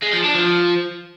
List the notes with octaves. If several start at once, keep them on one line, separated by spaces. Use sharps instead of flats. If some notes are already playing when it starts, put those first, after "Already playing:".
G#3
F3
D4
F3